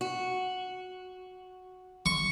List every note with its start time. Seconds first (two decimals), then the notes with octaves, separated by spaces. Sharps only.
0.01 F#4
2.06 C#6